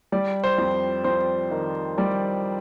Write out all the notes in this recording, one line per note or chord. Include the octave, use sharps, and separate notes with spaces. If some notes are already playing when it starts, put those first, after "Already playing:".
G3 D5
C5
F2
F2 C5
D#3
G3 D5